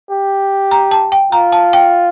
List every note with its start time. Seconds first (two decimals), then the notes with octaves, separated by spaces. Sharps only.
0.11 G4
0.71 A#5
0.91 A5
1.12 G5
1.32 F4 A#5
1.52 A5
1.73 G5